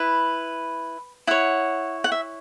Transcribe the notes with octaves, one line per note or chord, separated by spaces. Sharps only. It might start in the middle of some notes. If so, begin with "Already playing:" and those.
Already playing: E4 B4 B5
E4 C#5 F#5
F#5
E5